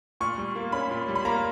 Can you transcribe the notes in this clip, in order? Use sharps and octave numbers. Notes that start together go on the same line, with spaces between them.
A#2 C#6
G3
A#3
C#4 B5
A#2
G3
B5
A#3 A#5